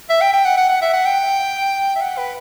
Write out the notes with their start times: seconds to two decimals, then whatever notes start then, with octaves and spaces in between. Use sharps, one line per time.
0.10 E5
0.21 G5
0.33 G5
0.45 F#5
0.57 F#5
0.69 F#5
0.82 E5
0.93 F#5
1.05 G5
1.96 E5
2.01 F#5
2.18 B4